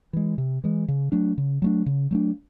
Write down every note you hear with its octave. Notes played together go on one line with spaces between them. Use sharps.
E3 G#3
C3
E3 G#3
C#3
F#3 A3 D4
C#3
F#3 A3 D4
C#3
F#3 A3 D4